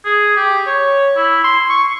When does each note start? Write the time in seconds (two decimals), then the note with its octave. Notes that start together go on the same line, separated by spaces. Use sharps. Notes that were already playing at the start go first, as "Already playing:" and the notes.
0.05 G#4
0.37 G4
0.67 C#5
1.17 E4
1.44 C6
1.70 C#6